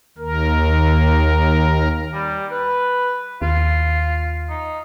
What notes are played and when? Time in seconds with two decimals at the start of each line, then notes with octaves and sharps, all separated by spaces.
0.18 D#2 A#4
2.13 G3
2.51 B4
3.42 D#2 F4
4.49 D#4